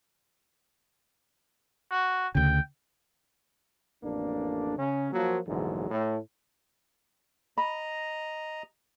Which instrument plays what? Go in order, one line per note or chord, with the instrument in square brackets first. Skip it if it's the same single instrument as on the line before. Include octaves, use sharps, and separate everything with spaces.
[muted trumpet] F#4
[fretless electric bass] D2 C#3 [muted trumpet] G5
[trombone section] A1 F2 A#3 D4
C#3 C#4
F3 F#3 A#3
A#1 E2 G#2 D3 E3 F#3
A2
[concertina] D#5 A#5 [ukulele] B5